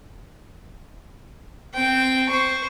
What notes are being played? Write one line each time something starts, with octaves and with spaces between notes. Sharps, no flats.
C4 G5
C5 C#6